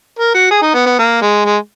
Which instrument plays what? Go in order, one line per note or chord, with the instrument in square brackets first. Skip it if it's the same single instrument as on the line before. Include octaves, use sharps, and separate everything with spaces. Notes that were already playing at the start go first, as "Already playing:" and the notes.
[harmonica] A#4
F#4
G#4
D#4
B3
B3
A#3
G#3
G#3